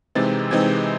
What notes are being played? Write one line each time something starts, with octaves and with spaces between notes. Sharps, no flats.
C3 E3 G#3 C4 D#4 A6
C3 E3 G#3 C4 D#4 G#6